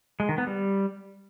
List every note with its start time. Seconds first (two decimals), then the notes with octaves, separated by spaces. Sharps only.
0.20 G#3
0.29 D#3
0.38 B3
0.47 G3